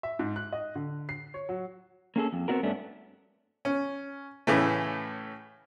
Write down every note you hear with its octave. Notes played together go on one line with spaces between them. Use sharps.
E5
G#2
F#6
D#5
D3
C7
C#5
F#3
A#3 C#4 G#4 A4
F2
B3 C4 D4 F#4 A#4
G2 A3 B3 C#4 D4
C#4
A2 C#3 E3 A3